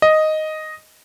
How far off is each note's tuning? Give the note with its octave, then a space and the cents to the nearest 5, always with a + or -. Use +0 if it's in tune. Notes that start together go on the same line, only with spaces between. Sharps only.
D#5 +0